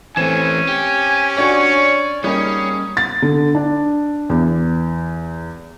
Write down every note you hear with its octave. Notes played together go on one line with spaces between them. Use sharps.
E3 A3 C4 C#4 G#5 E7
G4
D4 F#4 C#5 D5 G#5
G3 A#3 C#4 D#4 G#4
A6
D3
D4
E2